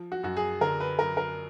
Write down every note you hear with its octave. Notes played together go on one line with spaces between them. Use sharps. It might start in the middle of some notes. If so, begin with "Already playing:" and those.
Already playing: F3
F#4
F#2 F#4
G#4
D3 A#4
B4
F#2 A#4
A#4